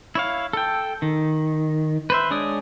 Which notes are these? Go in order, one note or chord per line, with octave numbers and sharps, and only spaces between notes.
E4 C#5 F5
A4 G5
D#3
B4 C5 E5
G#3 D4 C#5 D5 D#6